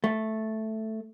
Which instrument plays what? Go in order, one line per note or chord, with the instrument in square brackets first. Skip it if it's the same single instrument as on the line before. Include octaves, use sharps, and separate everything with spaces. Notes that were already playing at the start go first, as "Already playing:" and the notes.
[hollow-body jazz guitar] A3